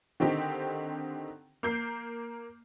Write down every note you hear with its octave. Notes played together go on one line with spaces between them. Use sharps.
D3 D#3 C4 D#4 G4
A#3 G6 C7